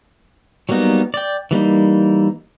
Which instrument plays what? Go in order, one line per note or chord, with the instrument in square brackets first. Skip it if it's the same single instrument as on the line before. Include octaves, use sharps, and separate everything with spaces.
[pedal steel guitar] F#3 G3 A#3 B3 D#4
D5 G5
E3 G3 A#3 D#4